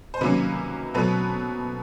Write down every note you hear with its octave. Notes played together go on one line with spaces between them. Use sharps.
C5
C3 D#3 F#3 A#3 C#4 B4
B2 F#3 A3 C4 B4